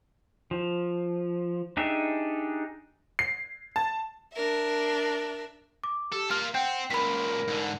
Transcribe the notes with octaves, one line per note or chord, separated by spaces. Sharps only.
F3
D4 D#4 G4 G#4 E5
C7
A5
D4 A#4 E5
D6
G4 A4
A#3 F4 F6
C4 F#5 G5 G6
C#2 A#2 A#4 B5 B6
G#2 D3